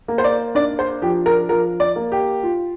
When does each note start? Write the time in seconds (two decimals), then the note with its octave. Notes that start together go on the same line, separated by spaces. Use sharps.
0.08 A#3
0.18 C5
0.24 D5
0.55 D4 D5
0.79 C5
1.02 F3 G4
1.26 A#4
1.49 F3 A#4
1.80 D5
1.96 A#3
2.12 G4
2.43 F4